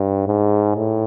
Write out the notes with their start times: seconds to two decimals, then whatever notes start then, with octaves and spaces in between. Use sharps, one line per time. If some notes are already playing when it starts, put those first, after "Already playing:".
Already playing: G2
0.27 G#2
0.76 A2